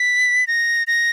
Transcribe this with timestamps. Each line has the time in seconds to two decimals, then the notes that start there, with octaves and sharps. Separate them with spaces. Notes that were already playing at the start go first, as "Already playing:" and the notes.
Already playing: B6
0.47 A#6
0.87 A#6